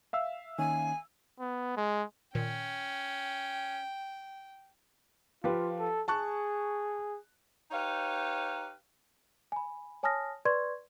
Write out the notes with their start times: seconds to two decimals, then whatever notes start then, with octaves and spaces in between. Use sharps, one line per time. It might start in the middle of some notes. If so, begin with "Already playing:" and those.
0.13 E5 F5 E6
0.59 D#3 A#3 C#4 G#5
1.40 B3
1.77 G#3
2.35 A#2 D#3 C#4 G5
5.44 F3 F4 G4 B4
5.79 A4
6.08 G#4 A5 C#6 F#6
7.71 D#4 G4 B4 C#5 F5
9.52 G#5 B5
10.03 C#5 G#5 A5 D#6 F6 A#6
10.45 B4 D5 C6 C#6 G#6